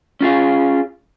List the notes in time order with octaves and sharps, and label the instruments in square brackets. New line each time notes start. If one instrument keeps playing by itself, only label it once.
[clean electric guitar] C#4 F4 G#4 F5